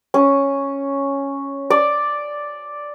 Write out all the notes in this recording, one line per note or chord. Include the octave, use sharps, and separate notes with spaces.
C#4
D5